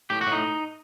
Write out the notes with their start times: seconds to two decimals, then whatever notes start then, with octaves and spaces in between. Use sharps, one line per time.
0.10 A2 G4
0.21 F#4
0.27 A2
0.32 D#4